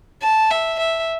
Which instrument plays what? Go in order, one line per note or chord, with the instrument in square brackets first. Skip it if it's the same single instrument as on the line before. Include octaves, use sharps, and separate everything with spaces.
[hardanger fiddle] A5
E5
E5